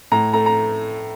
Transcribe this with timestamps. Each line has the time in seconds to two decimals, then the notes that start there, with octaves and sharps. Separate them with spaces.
0.12 A2 A#5
0.33 A3 A#5
0.46 A#5